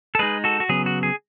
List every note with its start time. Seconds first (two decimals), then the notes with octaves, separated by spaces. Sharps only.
0.15 A4
0.19 G#3 D#4 G#4 B4
0.44 F#4 A4
0.60 F#4
0.69 C#3 F#3 B3 G#4
0.86 F#4
1.03 G#4